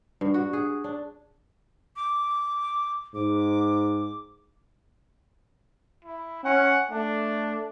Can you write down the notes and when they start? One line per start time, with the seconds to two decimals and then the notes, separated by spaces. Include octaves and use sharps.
0.21 G2
0.34 F#4
0.53 G#4
0.84 D4
1.96 D6
3.14 G#2 D6
6.05 E4
6.44 C#4 F#5
6.90 A3 D4